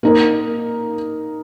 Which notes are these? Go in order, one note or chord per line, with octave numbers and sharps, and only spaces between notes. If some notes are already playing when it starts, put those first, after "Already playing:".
A#3 D#4 A#4